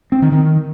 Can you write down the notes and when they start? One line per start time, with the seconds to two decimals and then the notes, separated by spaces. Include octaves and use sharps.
0.12 C4
0.22 D#3
0.32 D#3